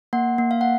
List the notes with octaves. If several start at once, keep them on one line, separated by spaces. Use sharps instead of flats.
A#3 F#5
A#3
F5
F#5